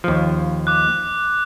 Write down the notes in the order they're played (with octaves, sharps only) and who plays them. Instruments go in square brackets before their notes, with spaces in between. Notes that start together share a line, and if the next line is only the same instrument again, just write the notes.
[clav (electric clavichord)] D#2 F3
[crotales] D6 F#6